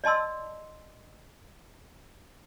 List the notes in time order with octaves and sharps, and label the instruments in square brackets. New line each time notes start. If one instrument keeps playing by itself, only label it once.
[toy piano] D5 D#5 A5 C6 E6